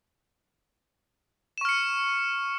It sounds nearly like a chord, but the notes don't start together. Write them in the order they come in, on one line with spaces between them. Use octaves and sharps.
E7 C#6 F6 C#7